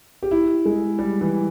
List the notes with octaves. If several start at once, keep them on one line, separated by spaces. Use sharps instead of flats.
G4
E4
G#3
G3
E3